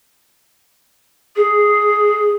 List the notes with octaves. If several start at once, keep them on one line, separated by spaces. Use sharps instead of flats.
G#4